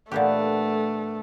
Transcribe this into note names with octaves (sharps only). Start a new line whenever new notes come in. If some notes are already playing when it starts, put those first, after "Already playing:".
A#2 D3 E3 A3 B3 G4 F#5